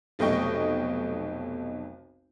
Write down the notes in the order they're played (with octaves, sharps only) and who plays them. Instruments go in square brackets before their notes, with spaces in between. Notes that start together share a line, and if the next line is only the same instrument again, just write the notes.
[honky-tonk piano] F1 B1 A3 D#5 G5 C#6